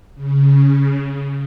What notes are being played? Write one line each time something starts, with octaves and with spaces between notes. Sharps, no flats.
C#3